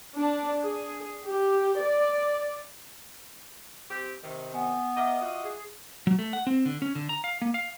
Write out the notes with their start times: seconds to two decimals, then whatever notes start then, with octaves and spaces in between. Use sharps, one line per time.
0.18 D4
0.62 G#4
1.26 G4
1.82 D5
3.91 C4 G4
4.24 C3 D#3
4.54 B3 G#5
4.97 A#4 D#5 E5 F#5 D6
5.22 F4 F#4 D#5
5.44 G#4
6.07 F#3
6.19 A3
6.33 F#5
6.47 C4
6.66 D3
6.82 C#4
6.95 D3
7.09 A#5
7.24 F5
7.42 A#3
7.54 F5